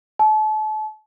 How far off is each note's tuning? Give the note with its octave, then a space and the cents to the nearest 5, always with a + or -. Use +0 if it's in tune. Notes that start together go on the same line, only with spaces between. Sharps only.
A5 -35